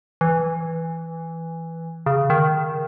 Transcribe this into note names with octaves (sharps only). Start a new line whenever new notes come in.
E3
C#3
D#3